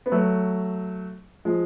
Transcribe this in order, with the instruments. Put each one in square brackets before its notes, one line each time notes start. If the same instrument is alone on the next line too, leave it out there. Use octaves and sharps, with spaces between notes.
[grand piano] B3
F#3 A3
F3 G#3